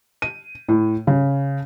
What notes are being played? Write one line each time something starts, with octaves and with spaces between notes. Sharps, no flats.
D#7
A2
C#3